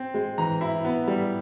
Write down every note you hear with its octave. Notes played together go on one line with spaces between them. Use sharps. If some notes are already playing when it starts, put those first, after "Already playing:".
Already playing: C4
G#3
E3 A#5
E4
B3
G3